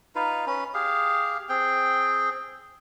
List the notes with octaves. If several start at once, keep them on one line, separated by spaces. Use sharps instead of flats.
D#4 F4 B4
C#4 B4
G4 G#4 F5
C4 G#4 G5